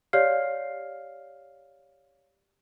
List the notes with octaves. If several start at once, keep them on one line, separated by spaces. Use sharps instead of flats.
G4 C#5 D5 F5 F6 C7